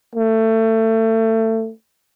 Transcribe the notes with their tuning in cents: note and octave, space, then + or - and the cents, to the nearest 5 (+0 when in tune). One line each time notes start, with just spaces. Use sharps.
A3 +25